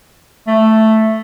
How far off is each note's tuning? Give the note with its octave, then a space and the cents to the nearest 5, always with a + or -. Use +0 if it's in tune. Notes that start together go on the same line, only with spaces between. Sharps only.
A3 +0